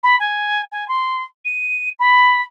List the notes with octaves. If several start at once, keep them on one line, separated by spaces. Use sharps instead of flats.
B5
G#5
G#5
C6
D#7
B5